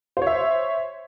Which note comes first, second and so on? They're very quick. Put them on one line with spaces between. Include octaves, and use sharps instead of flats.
C5 C#5 E5